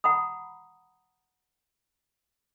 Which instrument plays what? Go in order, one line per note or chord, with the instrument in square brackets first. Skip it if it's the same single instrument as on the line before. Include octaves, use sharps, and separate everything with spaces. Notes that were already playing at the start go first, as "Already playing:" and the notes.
[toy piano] F#5 A#5 B5 D#6